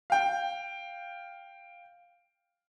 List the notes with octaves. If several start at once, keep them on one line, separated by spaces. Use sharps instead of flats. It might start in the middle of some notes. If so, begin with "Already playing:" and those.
F5 G5